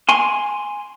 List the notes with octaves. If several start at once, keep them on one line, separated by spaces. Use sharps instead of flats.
G#5 C6